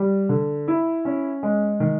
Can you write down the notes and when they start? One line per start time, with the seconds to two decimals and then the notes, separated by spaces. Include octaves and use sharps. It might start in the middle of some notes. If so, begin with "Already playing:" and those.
Already playing: G3
0.29 D3
0.68 E4
1.05 C#4
1.43 G#3
1.80 D#3